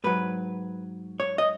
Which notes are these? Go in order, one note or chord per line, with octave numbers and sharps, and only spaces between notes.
G#2 F#3 B4
C#5
D#5